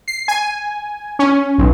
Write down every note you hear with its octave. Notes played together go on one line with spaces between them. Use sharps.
C7
G#5
C#4
B1